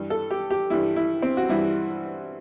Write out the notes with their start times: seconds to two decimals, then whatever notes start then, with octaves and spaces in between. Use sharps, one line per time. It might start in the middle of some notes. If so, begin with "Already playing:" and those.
Already playing: G2 E3 G3
0.10 A4
0.31 G4
0.51 G4
0.70 G2 E3 G3 E4
0.96 E4
1.22 C4
1.37 F#4
1.49 G2 E3 G3 E4